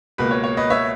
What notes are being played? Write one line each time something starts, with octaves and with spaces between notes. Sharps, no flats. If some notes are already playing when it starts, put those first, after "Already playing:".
C#2 B2 A#3 B4
C#5
C#5
B4 D#5
C#5 E5